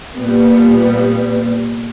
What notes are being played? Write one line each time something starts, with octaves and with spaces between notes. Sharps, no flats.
A#2 G3 B3